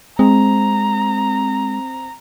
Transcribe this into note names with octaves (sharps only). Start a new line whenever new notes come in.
G#3 C4 A#5